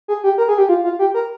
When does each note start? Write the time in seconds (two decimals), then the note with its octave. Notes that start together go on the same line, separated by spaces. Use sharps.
0.08 G#4
0.24 G4
0.38 A#4
0.48 G#4
0.58 G4
0.69 F4
0.84 F4
0.99 G4
1.14 A#4